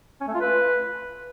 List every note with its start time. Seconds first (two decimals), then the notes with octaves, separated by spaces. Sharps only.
0.21 C#4
0.28 A3
0.34 F4
0.41 B4